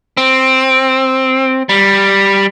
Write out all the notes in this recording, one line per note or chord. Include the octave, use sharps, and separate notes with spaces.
C4
G3